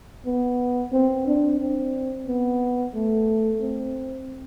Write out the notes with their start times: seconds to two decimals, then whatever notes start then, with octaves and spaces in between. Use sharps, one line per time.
0.26 B3
0.92 C4
1.27 D4
1.60 C4
2.27 B3
2.94 A3
3.61 C4